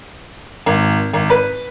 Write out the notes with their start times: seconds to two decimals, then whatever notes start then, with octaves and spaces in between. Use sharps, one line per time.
0.66 G#1
1.13 G#1
1.30 B4